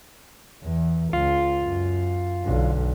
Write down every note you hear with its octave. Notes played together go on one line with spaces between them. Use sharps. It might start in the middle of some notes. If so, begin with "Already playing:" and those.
E2
C#2 F4
F#2
B1 D3